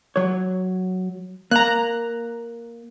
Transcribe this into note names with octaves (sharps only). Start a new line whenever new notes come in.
F#3 C#5
A#3 A#5 F#6